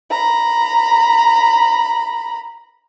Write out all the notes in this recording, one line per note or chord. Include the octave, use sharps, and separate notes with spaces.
A#5 B5